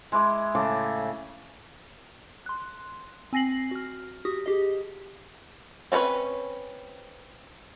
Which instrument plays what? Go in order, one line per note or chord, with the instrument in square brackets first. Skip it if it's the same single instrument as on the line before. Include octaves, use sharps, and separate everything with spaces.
[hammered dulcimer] G#3 E4 D6
A2 C#3 A5 D6
[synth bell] C6 F#6
C4 G#5 A#6 C7 F#7
F#4 F6
F#4 G4 D#6
G4 G#4 D#5
[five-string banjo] C4 C#4 F4 B4 C#5